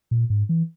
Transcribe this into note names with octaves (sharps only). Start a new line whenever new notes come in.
A#2
G#2
E3